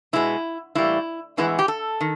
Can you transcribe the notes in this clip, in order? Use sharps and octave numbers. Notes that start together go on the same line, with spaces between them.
B2 G#3 B3 E4
A2 E3 G3 A#3 E4
A2 E3 G#3 B3 E4
G4
A4
D#3